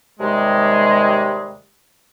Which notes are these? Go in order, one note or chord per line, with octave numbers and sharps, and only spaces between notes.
D#2 C3 G3 G#3